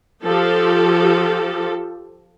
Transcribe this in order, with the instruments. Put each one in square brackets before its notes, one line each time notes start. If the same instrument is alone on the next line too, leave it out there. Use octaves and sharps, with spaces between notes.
[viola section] F3 G4 A4